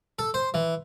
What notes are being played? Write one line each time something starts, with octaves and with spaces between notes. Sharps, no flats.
A4
C5
E3